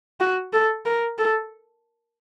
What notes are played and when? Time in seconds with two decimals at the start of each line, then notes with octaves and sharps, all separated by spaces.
0.20 F#4
0.53 A4
0.86 A#4
1.18 A4